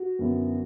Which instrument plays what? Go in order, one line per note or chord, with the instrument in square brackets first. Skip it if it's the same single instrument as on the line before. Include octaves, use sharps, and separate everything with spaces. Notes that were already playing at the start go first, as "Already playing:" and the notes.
Already playing: [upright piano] F#4
[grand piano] F#2 D3 F#3 B3 E4